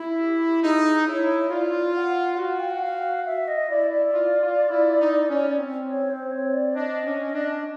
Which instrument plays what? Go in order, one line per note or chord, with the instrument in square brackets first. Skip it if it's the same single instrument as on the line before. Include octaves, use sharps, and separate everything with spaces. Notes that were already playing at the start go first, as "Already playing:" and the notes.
Already playing: [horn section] E4
[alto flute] G4
[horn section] D#4 [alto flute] G#4
[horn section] E4 [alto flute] C#5
[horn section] F4 [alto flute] D5
[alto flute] F#5
[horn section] F#4 [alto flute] F5
[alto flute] G5
F#5
F5
E5
D#5
[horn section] E4 [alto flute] D5
[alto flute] D5
[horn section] F4
F4
E4
D#4
C#4
C4
[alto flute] C#5
C5
C#5
D5
[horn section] D4 [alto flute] D#5
[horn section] C#4
D4